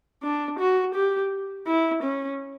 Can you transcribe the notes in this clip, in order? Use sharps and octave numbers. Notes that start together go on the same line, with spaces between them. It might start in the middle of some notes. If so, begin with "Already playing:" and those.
D4
F#4
G4
E4
C#4